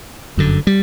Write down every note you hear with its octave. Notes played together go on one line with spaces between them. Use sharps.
G1 F#2 D3
G3